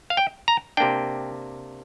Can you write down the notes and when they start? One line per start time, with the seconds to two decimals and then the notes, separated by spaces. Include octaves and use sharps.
0.10 F5
0.17 G5
0.48 A#5
0.77 C3 A#3 D4 G5